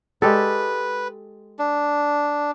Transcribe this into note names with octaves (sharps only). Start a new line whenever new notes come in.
G#3 G4 A4 B4
D4